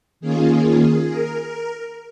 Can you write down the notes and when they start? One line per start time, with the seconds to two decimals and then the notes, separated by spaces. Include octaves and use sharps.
0.20 D#3 A#3 C#4 F4 G#4
1.09 A#4
1.39 A#4